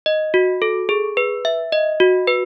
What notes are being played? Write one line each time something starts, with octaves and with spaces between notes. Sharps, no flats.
D#5
F#4
A4
G#4
B4
E5
D#5
F#4
B4